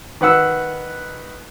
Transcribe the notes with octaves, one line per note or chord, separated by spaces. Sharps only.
D#3 B4 F#5 E6